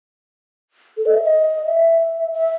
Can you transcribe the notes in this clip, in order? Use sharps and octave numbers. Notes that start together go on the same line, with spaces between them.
A4
D#5
E5
D#5
E5
E5